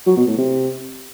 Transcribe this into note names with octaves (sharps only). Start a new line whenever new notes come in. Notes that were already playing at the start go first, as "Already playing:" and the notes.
F#3
B2
A2
C3